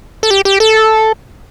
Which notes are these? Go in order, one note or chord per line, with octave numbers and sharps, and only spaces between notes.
A4
G4
G4
A4